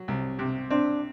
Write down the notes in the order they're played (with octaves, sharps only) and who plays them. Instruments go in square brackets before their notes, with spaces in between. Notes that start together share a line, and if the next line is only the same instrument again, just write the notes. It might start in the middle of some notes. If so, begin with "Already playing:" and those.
Already playing: [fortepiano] F#3
C2
C3
[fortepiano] C4 [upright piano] D4